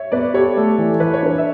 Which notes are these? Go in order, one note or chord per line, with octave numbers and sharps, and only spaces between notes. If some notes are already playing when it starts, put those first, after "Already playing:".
Already playing: C#5 E5
B3 B4 D5
G4 A4 C#5
A3 A4
E3
E3 B4
C#5
D4 B4
E5